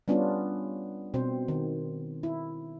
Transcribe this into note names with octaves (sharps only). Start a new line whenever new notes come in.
G3 B3 C#4 D4 F4
B2 C4 C5
D#3
E4